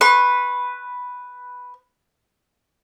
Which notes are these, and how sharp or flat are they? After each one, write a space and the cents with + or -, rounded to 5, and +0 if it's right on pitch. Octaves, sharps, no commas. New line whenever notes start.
B4 +0 C#6 -45